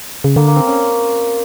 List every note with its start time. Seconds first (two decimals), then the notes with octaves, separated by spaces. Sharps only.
0.24 C#3
0.36 D3 A#3
0.47 A#3
0.56 C4
0.67 C#4